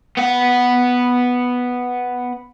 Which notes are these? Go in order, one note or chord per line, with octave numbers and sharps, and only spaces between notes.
B3 F#5